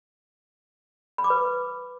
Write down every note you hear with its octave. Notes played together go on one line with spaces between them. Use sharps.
B5
D6
B4